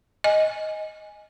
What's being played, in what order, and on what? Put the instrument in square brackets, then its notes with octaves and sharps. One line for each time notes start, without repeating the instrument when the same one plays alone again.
[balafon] D#5 G#5